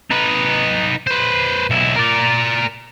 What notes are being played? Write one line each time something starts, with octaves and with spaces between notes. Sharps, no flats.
D#4 B4
B4 C5
B1 E4
A#4 D5